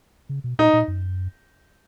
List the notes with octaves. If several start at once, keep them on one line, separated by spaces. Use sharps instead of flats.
C#3
B2
A#2 D#4
A#2
F#2